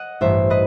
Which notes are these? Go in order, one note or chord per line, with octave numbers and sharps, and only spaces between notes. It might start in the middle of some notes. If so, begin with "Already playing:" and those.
Already playing: D#5 F#5
A1 G2 E3 C5 E5
B4 D#5